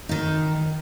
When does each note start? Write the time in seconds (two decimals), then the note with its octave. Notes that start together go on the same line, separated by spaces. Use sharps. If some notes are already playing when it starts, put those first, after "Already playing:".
0.09 D#3 D#4